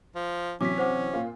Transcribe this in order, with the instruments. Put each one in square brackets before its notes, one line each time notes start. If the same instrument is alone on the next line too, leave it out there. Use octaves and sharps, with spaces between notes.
[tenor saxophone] F3
[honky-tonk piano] C3 E3 F#3 [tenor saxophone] C#4 [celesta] D6 B6
[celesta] C5 F#5 D6
[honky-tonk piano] A#2 F4